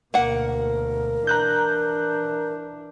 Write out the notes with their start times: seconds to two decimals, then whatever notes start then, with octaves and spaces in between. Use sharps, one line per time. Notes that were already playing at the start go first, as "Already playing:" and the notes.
0.14 D2 B2 A#3 A#4 F#5
1.27 E3 D4 A#5 F#6 G6